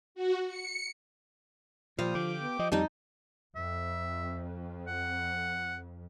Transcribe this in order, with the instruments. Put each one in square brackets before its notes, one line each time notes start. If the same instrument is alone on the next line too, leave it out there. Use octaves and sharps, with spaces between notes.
[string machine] F#4
C#7
[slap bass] A#2 [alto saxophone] F3 [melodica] G3 C5 D#6 [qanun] F5
[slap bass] D3 [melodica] G4 G5 D6
[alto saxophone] B3
[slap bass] F3 [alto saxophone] D#5
[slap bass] F2 [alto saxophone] G3 [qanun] D#4 D#5 A5
[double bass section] F2 [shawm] E5
[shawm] F#5